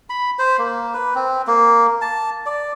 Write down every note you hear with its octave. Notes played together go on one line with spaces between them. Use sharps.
B5
C5
A#3
B4
C4
A#3
A5
D5